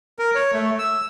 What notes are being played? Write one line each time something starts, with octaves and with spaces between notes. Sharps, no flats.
A#4
C#5
A3
E6